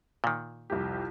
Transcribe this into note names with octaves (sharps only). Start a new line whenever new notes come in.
A#2 D#3
C2 F2 G4